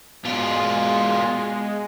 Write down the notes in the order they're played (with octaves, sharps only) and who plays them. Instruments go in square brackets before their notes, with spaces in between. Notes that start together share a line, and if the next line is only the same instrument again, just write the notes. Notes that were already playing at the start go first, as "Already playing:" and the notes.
[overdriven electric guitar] B2 F4 [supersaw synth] G#3